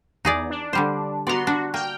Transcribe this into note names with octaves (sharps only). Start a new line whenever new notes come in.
E2 D#4 G#4 D5
D4
D3 G3 C5
B3 F#4 D5 A#5 C6
D4 F#4
A#3 G5 F6